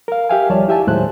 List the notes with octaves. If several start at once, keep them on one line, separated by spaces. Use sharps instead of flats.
A#4 F5
G4 A#4 E5 F5 G5 G#5
D#2 F3 G3 C#5 D5 A5
E4 G4 E5 G#5 A5
D#2 A2 F#3 G#3 C5 F#6